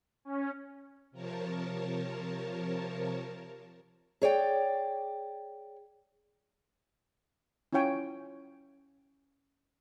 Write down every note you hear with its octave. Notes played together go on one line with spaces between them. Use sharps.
C#4
C3 F3 A#4 C#5 A5
G#4 C#5 D5 G5
C#4 E4 F4 C#5 G5 G#5